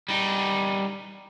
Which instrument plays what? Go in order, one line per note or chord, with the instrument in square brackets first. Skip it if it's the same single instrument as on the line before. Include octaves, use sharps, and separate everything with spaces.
[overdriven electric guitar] G3 D#4